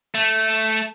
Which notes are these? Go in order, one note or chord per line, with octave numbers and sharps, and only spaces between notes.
A3